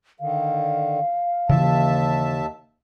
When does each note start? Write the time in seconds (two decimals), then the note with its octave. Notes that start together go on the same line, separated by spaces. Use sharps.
0.20 D3 D#3 F5
1.49 D#2 C#3 E3 F3 E5 A5